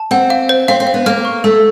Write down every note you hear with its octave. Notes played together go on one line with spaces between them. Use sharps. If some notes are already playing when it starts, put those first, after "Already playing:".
Already playing: A5
C4 F#5
F5
C5
C4 F5
C4
F5
B3
A#3 F6
C#6
A3 A4